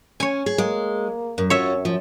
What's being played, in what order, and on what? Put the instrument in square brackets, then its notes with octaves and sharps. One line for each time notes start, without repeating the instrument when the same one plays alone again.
[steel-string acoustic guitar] C#4 [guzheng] C#5 G#5
[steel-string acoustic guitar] G#4
[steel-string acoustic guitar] G#3 [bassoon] A#3
[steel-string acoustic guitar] F#2
[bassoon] F#2 [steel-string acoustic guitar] C#4 F4 F#4 [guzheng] C#5 E5
[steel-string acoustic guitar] F3